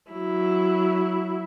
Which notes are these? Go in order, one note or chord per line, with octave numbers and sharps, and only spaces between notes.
F#3 E4